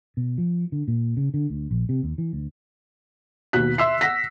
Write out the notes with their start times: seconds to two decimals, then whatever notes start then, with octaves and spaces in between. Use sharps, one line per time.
0.17 B2
0.38 F3
0.72 D3
0.88 A#2
1.17 C#3
1.34 D3
1.50 D2
1.71 A#1
1.89 C3
2.03 D#2
2.18 E3
2.33 D2
3.53 D#2 B2 F#6 B6
3.78 E5 C6 E6 B6 C7
4.01 F#5 A#6 B6